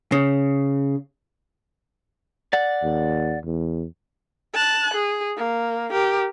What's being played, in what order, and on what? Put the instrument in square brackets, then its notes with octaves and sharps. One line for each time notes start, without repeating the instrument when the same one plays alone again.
[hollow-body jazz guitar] C#3
[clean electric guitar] D5 F#5
[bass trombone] D#2
E2
[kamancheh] A5 F#6
G#4
A#3
G4 A#4